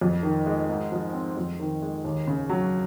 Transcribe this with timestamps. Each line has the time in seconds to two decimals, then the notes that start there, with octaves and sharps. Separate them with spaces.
0.01 F2
0.23 D#3
0.46 G#3
0.69 G#2
0.92 F3
1.13 C4
1.37 F2
1.60 D#3
1.82 G#3
2.05 D#2
2.27 C#3
2.49 F#3